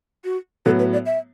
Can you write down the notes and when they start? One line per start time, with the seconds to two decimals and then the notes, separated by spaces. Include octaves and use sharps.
0.24 F#4
0.66 A2 F#3 B3 A4
0.79 B4
0.93 D5
1.06 E5